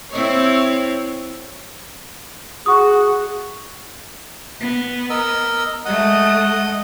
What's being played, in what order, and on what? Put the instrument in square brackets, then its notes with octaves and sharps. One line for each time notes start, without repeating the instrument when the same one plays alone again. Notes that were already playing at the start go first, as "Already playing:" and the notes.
[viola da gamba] C4 E4 C#5
[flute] F#4 [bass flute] G#4 [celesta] C#6 D#6
[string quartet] B3
[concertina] A#4 D#5 E6
[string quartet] G#3 A3 [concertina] D#5 F#5 D#6